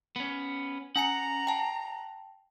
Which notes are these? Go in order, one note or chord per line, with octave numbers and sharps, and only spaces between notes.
B3 C#4
C#4 F#5 G#5 A#5 C#7
G5 A5